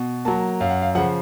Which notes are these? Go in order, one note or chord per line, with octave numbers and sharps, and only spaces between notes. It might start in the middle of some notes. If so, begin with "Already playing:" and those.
Already playing: B2
F#3 A#3 A5
F#2 F5
F#5
F5
C#3 F3 F#5